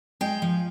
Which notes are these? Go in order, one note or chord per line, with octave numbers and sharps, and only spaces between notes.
G#3 G5
F3